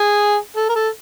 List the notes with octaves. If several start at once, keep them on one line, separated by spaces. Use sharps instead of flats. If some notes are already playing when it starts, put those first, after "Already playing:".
Already playing: G#4
A4
A#4
A4